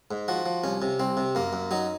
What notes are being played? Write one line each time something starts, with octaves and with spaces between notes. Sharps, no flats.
G#2
F3 F#4
F3
C2 C#4
C3
C2 C4
C3
F#2 A#3
F#2
F#3 D#4